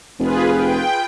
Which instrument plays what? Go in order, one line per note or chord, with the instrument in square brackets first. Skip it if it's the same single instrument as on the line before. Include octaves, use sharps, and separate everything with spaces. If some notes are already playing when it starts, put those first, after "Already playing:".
[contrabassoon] F1 [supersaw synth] F4 G#4 B4
[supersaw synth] G5